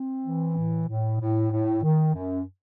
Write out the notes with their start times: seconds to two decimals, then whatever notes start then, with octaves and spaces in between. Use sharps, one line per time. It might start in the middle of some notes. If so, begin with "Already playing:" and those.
Already playing: C4
0.25 E3
0.57 A2
0.88 A2
1.20 A2
1.52 A2
1.83 D#3
2.14 F#2